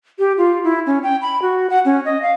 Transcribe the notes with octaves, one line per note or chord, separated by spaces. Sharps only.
G4
F4
E4
C#4
G5
B5
F#4
F#5
C#4
D#5
F5